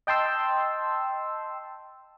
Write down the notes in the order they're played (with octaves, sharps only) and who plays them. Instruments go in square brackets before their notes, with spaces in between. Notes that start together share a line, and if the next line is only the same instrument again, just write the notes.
[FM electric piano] D#5 G5 A5 C6 E6